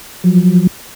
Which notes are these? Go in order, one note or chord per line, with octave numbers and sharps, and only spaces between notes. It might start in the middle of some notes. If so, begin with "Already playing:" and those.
F3 F#3